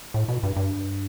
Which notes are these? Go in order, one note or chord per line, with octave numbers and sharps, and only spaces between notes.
A2
B2
G2
G2